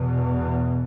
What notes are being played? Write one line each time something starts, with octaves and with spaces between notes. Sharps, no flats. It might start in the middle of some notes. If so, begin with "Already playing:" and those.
Already playing: E2 B2